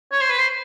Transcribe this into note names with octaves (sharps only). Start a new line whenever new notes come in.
C#5
C5
B4
C5